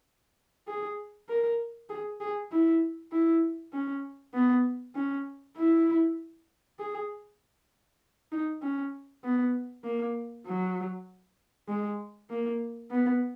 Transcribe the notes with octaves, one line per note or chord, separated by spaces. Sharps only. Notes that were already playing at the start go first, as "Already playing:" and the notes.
G#4
A#4
G#4
G#4
E4
E4
C#4
B3
C#4
E4
G#4
D#4
C#4
B3
A#3
F#3
G#3
A#3
B3